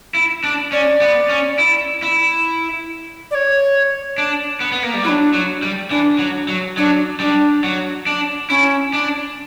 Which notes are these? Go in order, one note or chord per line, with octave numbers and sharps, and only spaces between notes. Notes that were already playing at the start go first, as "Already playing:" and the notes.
E4
D4
C#4 D5
B3
C#4
E4
E4
D5
C#5
D4
B3
B3
A#3
G3
F#3 E4
D4
F#3
G3
E3 D4
F#3
F#3
F#3 D4
G3 D4
F#3
D4
C#4 E4
D4